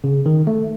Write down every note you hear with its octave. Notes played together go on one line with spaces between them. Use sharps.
C#3
D#3
A3